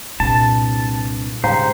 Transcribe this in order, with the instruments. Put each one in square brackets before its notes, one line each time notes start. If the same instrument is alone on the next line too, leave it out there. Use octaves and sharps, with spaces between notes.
[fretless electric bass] C2 G2 [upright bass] A#2 [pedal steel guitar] A5
[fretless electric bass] G#2 C#3 G3 [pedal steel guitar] C5 [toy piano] F5 G5 A#5